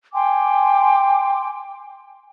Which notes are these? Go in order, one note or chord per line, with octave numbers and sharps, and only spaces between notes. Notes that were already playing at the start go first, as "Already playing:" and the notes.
G5 G#5 C6 D6